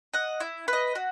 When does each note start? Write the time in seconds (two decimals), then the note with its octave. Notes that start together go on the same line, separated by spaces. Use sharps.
0.13 D#5 F#5
0.40 E4
0.68 B4
0.73 D#5
0.95 F#4